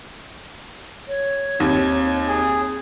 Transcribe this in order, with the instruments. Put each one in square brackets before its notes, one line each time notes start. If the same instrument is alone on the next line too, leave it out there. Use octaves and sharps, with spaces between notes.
[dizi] C#5
[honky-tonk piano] D#2 [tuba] C4
[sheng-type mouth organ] G#4